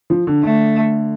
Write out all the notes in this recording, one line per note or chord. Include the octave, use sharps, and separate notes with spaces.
F3
D3
D3 A3